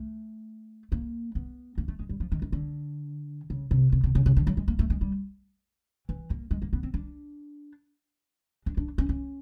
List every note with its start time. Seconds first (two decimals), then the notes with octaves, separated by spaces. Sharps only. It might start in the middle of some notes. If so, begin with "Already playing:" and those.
Already playing: A3
0.92 A#3
1.35 B3
1.78 A#3
1.88 A3
1.99 G#3
2.09 G3
2.20 F3
2.32 D#3
2.42 D#3
2.52 D3
3.50 C#3
3.71 C3
3.92 C3
4.04 C3
4.15 C#3
4.26 C#3
4.37 D3
4.47 F#3
4.57 G#3
4.68 A#3
4.79 A3
4.90 G#3
5.01 G3
6.09 E3
6.30 A#3
6.51 G#3
6.62 A#3
6.73 B3
6.83 C4
6.94 D4
8.66 D4
8.77 D4
8.98 C#4
9.09 C#4